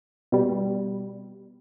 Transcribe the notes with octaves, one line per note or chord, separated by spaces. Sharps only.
B2 G3